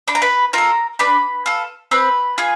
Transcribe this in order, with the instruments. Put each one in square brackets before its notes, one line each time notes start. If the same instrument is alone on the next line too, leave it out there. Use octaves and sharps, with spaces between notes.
[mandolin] D4 B5
A#5
B4 B5
F4 A4 A#4 A#5
D4 B4 B5
F4 A4
C4 B4 B5
F4 G#4